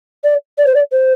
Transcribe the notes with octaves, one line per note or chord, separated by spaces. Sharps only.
D5
D5
C5
D5
C5